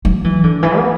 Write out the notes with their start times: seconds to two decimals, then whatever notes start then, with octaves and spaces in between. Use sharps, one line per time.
0.05 F#3
0.24 E3
0.44 D3
0.63 E3
0.77 B3